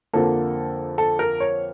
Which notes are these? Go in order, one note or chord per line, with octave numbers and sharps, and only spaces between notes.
F2 D3 F3 A#3 A4
A4
A#4
C#5